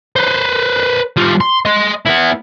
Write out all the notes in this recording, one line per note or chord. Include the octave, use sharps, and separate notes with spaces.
B4 C5
G3 F4
C6
D#5 C6
B3 E4